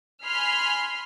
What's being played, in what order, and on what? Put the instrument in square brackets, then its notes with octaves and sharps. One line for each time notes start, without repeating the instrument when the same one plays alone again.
[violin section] G#5 B5 C6 F6 B6 C7